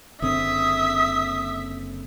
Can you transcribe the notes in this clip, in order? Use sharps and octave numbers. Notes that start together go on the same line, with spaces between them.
F#1 D3 C4 E5 D#6